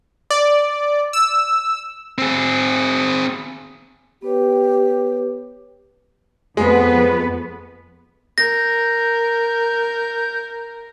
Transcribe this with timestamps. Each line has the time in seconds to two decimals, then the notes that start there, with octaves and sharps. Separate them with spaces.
0.31 D5
1.13 E6
2.18 C4 G#4
4.22 B3 G4 B4 C#5
6.57 F2 G#3 B3 B4
8.38 A#4 G6 A#6